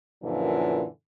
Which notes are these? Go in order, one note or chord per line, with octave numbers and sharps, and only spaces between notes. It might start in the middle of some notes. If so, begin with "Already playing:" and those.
F#2 A#2 D3 E3 F3